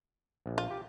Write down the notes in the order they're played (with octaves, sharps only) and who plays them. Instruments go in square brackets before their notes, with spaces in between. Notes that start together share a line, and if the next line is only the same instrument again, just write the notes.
[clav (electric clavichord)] A#1
[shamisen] F4
[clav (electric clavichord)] G4